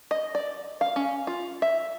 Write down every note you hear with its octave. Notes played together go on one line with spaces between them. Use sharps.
D#5
D5
F5
C#4
F4
E5